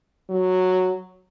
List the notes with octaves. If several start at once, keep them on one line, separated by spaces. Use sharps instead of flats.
F#3